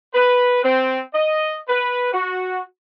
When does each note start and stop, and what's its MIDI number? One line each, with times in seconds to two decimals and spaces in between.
0.14 0.59 71
0.63 0.99 60
1.14 1.56 75
1.69 2.10 71
2.12 2.59 66